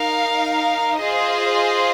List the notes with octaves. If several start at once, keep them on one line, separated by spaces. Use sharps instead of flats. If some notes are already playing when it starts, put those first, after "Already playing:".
Already playing: D#4 A#4 F5
F4 G#4 C5 D#5